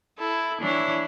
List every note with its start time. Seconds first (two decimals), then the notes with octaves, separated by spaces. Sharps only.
0.19 E4 A4
0.60 E3 D4 E4 C#5